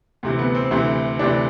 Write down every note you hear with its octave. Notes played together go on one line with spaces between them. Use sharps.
D2 C3 E3
B3
C4
D2 C3 E3 E4
D2 C3 E3 D4